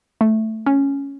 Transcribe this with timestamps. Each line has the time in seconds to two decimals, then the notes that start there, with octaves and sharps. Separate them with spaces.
0.21 A3
0.66 C#4